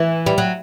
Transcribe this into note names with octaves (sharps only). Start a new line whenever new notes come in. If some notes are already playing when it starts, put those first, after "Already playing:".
Already playing: E3
G3
F#3